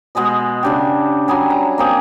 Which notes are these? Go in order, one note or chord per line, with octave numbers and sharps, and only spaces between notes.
B2 G#3 G#4 D#5
C#3 D4 G4
F#3 G3 G#4 G#5
A#5
A#3 C4 G#4